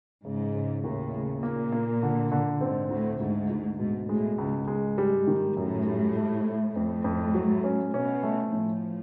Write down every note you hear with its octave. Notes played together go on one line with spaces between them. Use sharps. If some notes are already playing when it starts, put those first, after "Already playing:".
G#2 C#3
C#3
D#2 A2
C#3
A#2 A#3
A#3
D3
D3
G#2 C4
D2 A2
D2 G#2
D2
G#2 B2
A2 G#3
C#2 G#2
G#2 G#3
G3
D#3
F#2 A2
G3
A3
A3
F2 A2
F2
F#3
C#4
B2 C#4
A3
A2 F3